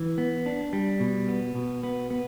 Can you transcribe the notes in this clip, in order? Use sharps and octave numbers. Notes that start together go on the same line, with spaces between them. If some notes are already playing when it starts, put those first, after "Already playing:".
Already playing: E3
B3
D4
G3
B2
B3
B2
B3
B3